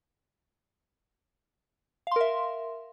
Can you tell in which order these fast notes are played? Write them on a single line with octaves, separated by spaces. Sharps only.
F5 C6 A#4 E5